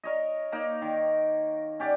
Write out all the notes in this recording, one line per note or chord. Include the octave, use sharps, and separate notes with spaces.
A#4 C#5 D#5
A#3 D#4 A#4
D#3
C#4 G4 D5 F#5